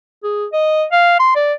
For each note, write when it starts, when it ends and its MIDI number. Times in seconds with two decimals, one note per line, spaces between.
0.23 0.46 68
0.53 0.85 75
0.92 1.19 77
1.19 1.34 84
1.36 1.53 74